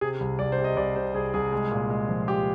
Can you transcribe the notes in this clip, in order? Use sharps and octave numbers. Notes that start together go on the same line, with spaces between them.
C3 G#4
C2
C2 D5
C5
C3
D#5
C2 D5
C3 C5
C2 G#4
C2 G#4
G#3
A#2
G#3
F3
F3 G4